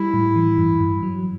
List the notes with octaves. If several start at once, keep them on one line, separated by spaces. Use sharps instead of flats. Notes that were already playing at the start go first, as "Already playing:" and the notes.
Already playing: G3 E4
A2
E3
G2
G2
F#3